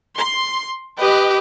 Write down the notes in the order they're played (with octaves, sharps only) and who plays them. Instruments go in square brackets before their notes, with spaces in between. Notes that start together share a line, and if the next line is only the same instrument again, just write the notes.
[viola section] C6
[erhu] G4 [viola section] B4 D#5